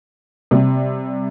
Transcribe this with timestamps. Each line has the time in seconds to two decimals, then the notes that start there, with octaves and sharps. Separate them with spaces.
0.51 C3 G3